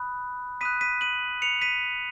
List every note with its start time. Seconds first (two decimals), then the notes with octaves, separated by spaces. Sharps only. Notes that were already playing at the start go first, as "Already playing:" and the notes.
Already playing: B5 D#6 F#6
0.61 B5 D#6 F#6 B6 D#7
0.81 B6 D#7
1.01 D#7 F#7
1.42 C#7 F7
1.62 B6 D#7